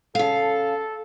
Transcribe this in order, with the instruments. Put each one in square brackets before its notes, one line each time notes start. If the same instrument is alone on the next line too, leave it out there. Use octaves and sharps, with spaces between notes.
[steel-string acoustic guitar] C#3 F5 [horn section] A4